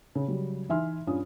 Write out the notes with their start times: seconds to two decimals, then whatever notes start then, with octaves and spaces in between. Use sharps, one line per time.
0.15 C#3
0.28 C#3 F#3 G3
0.69 E3 D#4 E5 G#5 C6 F6
1.07 G2 C#4 F4 D#6